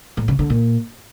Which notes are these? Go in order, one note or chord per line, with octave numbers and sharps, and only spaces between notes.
A2
C#3
D3
A#2